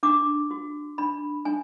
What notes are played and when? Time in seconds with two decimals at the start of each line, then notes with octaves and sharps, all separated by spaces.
0.03 D4 D6
0.51 F#4
0.98 D4 B5
1.45 D4 G#5